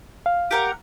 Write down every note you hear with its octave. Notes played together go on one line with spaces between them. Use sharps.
F5
G4 A#4 F#5